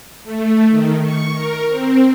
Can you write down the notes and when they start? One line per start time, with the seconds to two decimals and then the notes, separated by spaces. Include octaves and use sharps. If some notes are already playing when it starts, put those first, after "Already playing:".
0.24 A3
0.70 D#3
1.03 C#6
1.33 A#4
1.68 C4